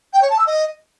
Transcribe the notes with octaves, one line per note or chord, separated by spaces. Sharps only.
G5
C#5
A5
E6
D#5